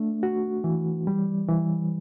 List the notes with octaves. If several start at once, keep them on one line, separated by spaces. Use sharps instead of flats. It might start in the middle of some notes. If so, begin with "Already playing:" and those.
Already playing: A3 D4
F#4
E3
G3
E3